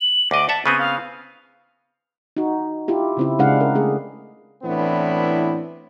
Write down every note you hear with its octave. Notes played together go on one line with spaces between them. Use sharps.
F#7
D2 D#5 D6
E5 F#5 A5
C#3 B3 C4 D#7
F5
D#4 F#4
E4 F4 G4
C#3 C4 E4
C#3 G#3 D4 E4 F5 F#5
A#4
A3 G#4
A2 E3 B3 C4 D4 E4